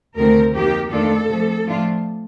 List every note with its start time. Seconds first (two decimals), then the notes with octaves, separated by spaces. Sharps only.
0.16 D2 C3 D#3 A3 C4 A#4
0.54 F2 D#3 A#3 G4
0.91 F2 D#3 A3 D4 F4 A4
1.28 C3 F3 A3
1.65 A2 F3 A3 D4 F4